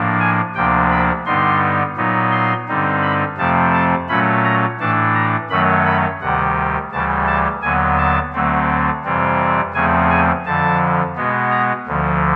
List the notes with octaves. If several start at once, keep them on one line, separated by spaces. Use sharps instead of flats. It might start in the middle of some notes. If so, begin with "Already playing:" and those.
Already playing: A2 F3 A#3 D4
G#5
D2 C3 F3 A#3 D4 G5
B5
G2 D3 G3 B3 D#4 C6
A#2 F#3 B3 D#4
C6
G2 D3 G3 C4 D#4
B5
F2 C3 F3 A3 C4 A5
A5
A#2 F#3 A3 C#4 B5
A#5
A2 E3 A3 D4 A5
A#5
F#2 D#3 F#3 A3 C#4 B5
B5
D2 C3 D#3 G3 F#5
D2 C#3 E3 G3 A5
A5
D#2 D3 F#3 B3 G#5
A5
D2 D3 F#3 A3 C4
F2 C3 E3 G3 C4
E2 C#3 F3 A3 C4 G#5
G#5
F2 D3 F3 A5
B2 G#3 B3
A#5
D2 D3 F3